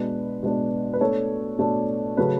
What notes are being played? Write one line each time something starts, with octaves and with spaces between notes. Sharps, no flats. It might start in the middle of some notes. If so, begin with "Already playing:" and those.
Already playing: B2 G#3 D4 B4
B2 G#3 D4
B4
B2 A3 D4 A4 C#5
B2 A3 D4
C#3 F#3 A3 C#4 B4